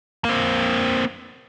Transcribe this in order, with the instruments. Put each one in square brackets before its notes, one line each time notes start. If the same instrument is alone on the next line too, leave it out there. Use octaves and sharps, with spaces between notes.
[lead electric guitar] A#3 C4